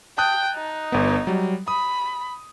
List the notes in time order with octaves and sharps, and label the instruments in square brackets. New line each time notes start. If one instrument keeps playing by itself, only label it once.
[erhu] G5 [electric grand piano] A5 D#6 F#6
[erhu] D#4
[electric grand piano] G1 B3
F#3 G3
[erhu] B5 [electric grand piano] D#6